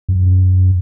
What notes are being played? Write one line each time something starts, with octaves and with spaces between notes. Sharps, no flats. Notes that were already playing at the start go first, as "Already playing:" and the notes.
F#2